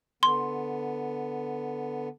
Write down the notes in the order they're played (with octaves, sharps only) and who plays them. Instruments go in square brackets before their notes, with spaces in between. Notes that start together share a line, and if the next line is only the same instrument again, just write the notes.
[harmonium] D3 B3 [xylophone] C6